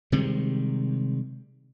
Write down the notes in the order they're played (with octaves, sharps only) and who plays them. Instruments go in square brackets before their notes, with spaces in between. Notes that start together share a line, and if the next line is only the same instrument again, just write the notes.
[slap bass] C3 D#3 G3 G#3